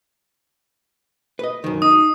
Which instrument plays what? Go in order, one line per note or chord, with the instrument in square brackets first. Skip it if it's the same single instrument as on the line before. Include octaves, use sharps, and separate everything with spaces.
[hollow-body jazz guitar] B4 D#5
F#2 D#3
[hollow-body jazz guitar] D#4 [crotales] D#6